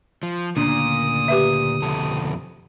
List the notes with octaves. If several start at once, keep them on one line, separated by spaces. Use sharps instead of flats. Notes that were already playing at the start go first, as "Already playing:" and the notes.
F3
D2 A#2 C#3 D4 D#6
G4 B4 E5
F2 B2 A4